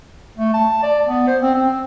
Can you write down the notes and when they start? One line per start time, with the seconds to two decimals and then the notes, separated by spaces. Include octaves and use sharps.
0.37 A3
0.53 A5
0.83 D5
1.07 B3
1.27 C5
1.42 C4
1.54 C4